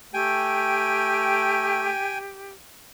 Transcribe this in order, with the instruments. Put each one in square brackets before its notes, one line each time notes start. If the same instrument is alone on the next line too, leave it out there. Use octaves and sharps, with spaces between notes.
[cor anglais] A3 [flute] G4 [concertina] G5 G#5